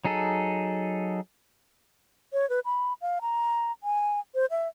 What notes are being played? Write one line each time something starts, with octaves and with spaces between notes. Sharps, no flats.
F#3 D#4 G#4 A4
C#5
B4
B5
F5
A#5
G#5
C5
E5